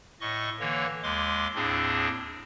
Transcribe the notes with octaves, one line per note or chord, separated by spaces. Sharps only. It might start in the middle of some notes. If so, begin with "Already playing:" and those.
A2 D#5 C#6
D3 E3 A#3 C#5
D#2 G#3 C6 D6
D#2 A2 C4 D4 G#4